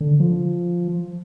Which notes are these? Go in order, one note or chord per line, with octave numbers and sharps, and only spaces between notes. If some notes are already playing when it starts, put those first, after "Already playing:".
D3
F3